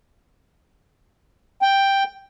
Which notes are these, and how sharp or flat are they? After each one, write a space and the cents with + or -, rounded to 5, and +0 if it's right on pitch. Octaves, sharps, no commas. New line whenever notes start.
G5 +5